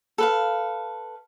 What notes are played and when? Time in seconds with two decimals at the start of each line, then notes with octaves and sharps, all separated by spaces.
0.18 A4 B4 F5